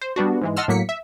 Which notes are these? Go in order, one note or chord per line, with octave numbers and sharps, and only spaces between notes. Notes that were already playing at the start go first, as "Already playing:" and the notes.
C5
G3 B3 D4 F#4
G#2 E3 G#3
D#5 F#5 A5 C6 E6 F6
A2 F#3 A#3 B6 C#7
E5